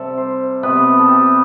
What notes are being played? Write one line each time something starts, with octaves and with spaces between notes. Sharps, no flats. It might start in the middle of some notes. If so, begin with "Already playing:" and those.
Already playing: C3 G3 A4
C5
C3 G3 B3 B4
A4
G4